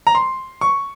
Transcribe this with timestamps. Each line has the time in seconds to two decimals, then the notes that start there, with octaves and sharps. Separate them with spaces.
0.07 A#5
0.15 C6
0.61 C#6